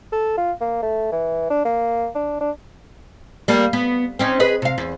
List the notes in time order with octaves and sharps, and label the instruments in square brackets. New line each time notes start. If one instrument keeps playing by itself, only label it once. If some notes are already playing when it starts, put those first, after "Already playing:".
[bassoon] A4
F4
A#3
A3
E3
D4
A#3
D4
D4
[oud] G3 A#3 A4
B3
C4 C#4 D#4
G#4 B4 D#5
C3 F5
E2